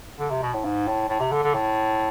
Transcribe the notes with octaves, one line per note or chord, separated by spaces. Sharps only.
D3
C3
B2
A2
G#2
A2
A2
C3
D3
D3
A2